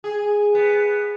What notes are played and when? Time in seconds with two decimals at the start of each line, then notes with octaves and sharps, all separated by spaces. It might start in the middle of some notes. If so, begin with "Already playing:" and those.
0.04 G#4
0.55 B3